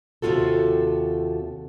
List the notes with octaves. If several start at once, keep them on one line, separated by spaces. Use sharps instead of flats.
D#2 C3 A3 F4 F#4 A4